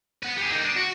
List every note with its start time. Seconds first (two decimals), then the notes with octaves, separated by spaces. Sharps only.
0.23 B4 F#5
0.38 G4 G#4
0.51 A#3 D#4
0.64 D4
0.76 F#4